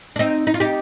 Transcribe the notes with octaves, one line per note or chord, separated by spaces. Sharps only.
D4
C4 D#4
D#4
F4
D#4 G4